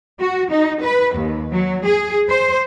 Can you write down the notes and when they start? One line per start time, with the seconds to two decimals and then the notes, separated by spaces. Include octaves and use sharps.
0.18 F#4
0.50 D#4
0.83 B4
1.15 D#2
1.53 F#3
1.85 G#4
2.29 C5